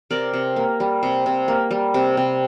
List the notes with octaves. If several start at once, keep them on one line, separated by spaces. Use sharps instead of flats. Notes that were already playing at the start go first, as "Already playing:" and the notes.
C3 A#4 D5
C3
A#3
G3
C3
C3
A#3
G3
C3
C3